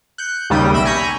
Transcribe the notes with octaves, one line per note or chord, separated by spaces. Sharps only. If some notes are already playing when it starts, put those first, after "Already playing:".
F#6 G6 C#7
D#2 C#3 G3 G5 D#6 B6
B1 E5 B5 A#6 D7 E7
G#5 A#5 B5 C#6 G6 A#6